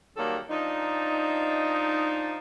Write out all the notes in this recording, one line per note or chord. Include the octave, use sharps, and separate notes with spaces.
D#3 F#3 G3 A#3 A4
F3 D4 D#4